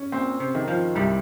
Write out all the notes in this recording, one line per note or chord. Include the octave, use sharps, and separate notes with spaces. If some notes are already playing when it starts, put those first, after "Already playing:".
Already playing: C#4
A#2 C4
C3
D#3
F3
C2 G3